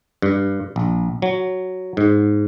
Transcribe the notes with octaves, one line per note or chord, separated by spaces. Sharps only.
G2
A#1
F#3
G#2